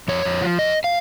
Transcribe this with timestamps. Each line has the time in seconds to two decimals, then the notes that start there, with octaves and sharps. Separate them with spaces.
0.08 F2 C#5
0.25 F2
0.42 F3
0.59 F2 D#5
0.84 F5